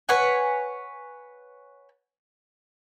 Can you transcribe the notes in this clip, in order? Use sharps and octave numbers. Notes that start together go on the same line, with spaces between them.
B4 C#5 F#5 G#5